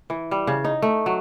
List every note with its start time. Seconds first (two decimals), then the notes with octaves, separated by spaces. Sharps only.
0.10 E3
0.31 G3
0.47 C#3
0.64 D#4
0.82 A3
1.06 F#3